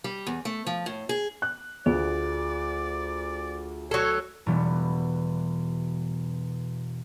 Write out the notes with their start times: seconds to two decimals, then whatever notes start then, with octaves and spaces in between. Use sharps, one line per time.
0.04 G3
0.27 E2
0.45 A3
0.67 F3
0.86 A2
1.09 G#4
1.42 F#6
1.86 D2 F4 G#4 D5
3.91 F#3 A4 C#5
4.46 E1 B2 E3 G3 B3